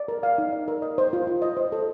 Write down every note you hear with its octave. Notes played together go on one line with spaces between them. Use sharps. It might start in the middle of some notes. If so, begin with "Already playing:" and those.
Already playing: D5
A#4
F5
D#4
D5
A#4
D#5
C5
F4
F4
D#5
C5
A4